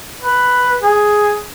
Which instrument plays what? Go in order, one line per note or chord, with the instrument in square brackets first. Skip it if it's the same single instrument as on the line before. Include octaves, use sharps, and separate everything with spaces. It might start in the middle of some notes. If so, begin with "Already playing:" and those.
[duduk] B4
G#4